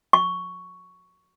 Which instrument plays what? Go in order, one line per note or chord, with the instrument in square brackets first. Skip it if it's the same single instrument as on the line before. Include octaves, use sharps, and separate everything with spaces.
[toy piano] C#6